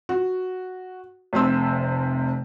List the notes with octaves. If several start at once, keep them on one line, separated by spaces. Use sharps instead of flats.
F#4
F1 C3 C6 E6